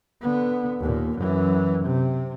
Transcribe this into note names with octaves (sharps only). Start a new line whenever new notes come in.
D3 B3
D#2 A#2
F#2 E3
C3